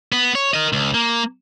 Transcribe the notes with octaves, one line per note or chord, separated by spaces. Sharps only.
B3
C#5
A#4 D#5
C#2
A#3